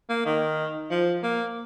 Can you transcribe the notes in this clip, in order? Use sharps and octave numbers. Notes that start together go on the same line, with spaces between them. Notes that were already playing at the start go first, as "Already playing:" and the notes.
A#3
D#3
F3
A#3